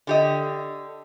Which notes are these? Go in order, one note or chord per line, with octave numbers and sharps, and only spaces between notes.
D3 G4 D#5